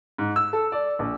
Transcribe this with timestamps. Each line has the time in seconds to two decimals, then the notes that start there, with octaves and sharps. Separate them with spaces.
0.18 G#2
0.36 E6
0.53 A4
0.72 D5
0.99 A#1